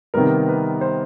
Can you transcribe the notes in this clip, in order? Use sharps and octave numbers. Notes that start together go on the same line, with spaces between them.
C3 D#3 G3 B3 A#4
B4
C5